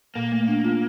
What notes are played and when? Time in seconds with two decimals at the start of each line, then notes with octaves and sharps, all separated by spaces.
0.15 A#2 A#3
0.32 A3
0.48 D4
0.64 F4